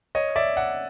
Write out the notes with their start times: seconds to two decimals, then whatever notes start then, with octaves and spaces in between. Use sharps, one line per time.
0.15 C#5 D#5
0.36 D5 E5
0.57 E5 F#5